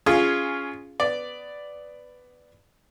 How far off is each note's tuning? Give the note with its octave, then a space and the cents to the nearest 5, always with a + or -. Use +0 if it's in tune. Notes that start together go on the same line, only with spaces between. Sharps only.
C#4 +10 F4 -5 G#4 +0
B3 +10 D5 +0